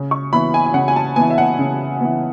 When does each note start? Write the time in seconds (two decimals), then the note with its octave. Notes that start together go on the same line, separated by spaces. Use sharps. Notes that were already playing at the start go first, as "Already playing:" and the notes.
Already playing: C#3
0.11 C#6
0.33 E3 B3 B5
0.54 G#5
0.66 G#5
0.74 C#3 F#5
0.88 G#5
0.96 A5
1.16 E3 B3 G#5
1.30 E5
1.38 F#5
1.59 C#3
2.01 E3 B3